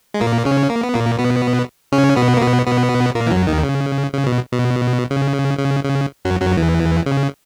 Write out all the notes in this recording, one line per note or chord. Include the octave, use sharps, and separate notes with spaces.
G#3
A#2 A#3
C#3 C#4
A#3
B3
A#2 A#3
B2 B3
C#3 C#4
B2 B3
A#3
B2 B3
B2 B3
A#2 A#3
E3
F#2 F#3
D#2 D#3
C#3
C#3
B2
B2
C#3
C#3
C#3
F#2 F#3
F#2 F#3
E2 E3
C#3